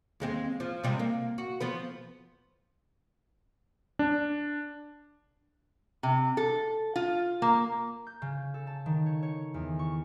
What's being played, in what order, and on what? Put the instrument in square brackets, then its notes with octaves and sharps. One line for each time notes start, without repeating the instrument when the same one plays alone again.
[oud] D#2 G#3 C4
F3
C3 G3 G#3
A#3
F#4
F3 B3 B4
[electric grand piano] D4
[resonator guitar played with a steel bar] C3
A4
F4
A#3
[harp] G6
C#3
A4
A5
D#3
C#5
C#5
E2
C#6